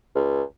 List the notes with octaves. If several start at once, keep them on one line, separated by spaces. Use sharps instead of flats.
C#2